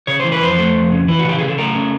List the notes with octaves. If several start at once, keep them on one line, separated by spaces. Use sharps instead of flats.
C#3 C#5
E3 C5
B4
F2 C5
A3
F2
C#3
E3 B4
F#4
C#3 G4
C#3 G#4
A4
A3 A#4
C#3